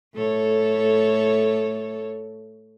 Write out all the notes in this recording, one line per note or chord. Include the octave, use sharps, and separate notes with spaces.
A2 A4 C#5